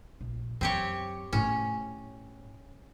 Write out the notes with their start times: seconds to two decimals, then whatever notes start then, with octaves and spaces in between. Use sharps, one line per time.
0.21 A#1
0.61 F#2 C4 G4 C#5
1.33 A2 C#4 D4